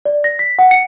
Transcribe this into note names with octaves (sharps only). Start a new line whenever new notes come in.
D5
A#6
B6
F#5
C#7